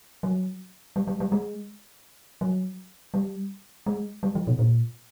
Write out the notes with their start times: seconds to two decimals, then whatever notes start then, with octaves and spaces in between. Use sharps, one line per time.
0.23 F#3
0.96 G3
1.08 G3
1.20 G3
1.32 G#3
2.41 F#3
3.14 G3
3.86 G#3
4.23 G3
4.35 F3
4.47 B2
4.59 A#2